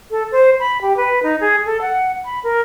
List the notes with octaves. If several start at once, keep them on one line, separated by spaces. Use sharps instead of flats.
A4
C5
B5
G4
B4
D#4
G#4
A4
F#5
B5
A#4